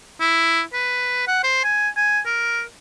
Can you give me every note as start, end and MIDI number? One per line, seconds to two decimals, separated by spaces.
0.20 0.62 64
0.73 1.24 71
1.27 1.40 78
1.43 1.63 72
1.64 1.89 80
1.96 2.20 80
2.26 2.62 70